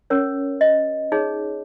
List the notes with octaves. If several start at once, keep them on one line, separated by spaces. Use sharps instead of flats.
C#4 A#4 C#5
D#5
D#4 G#4 C#5